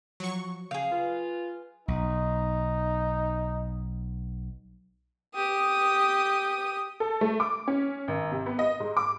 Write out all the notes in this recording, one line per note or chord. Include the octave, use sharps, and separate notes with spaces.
F3 F#3 C#6
C#3 G#4 F5
F4 B4
B1 D#4
G4 D#6
A4
A3
D6
C#4
G#1
C3
B3
D#5
G#2
D6